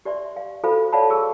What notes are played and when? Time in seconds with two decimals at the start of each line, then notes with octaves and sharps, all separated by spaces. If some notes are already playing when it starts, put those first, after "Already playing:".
0.05 G4 D5 E5 C6
0.36 F5
0.63 F4 F#4 A4 C5 F5 B5
0.93 C#5 D5 F5 F#5 A5 B5
1.10 G#4 C#6 E6